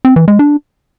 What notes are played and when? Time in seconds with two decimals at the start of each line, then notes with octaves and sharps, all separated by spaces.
0.05 C4
0.16 E3
0.28 G#3
0.39 D4